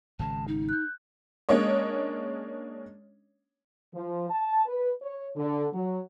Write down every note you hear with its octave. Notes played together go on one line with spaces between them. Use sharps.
G#1 C#3 G#3 A5
D#4
F#6 G6
G#3 A#3 C#4 D4 C#5 D#5
F3
A5
B4
C#5
D3
F#3